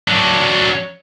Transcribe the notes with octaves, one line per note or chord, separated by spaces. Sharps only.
F#3 D4